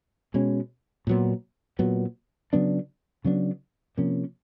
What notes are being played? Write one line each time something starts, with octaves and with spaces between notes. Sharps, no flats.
B2 G#3 C#4
A#2 F#3 B3
A#2 F#3 B3
C#3 F#3 B3 D4
C#3 F#3 B3 D4
C3 F3 A#3 C#4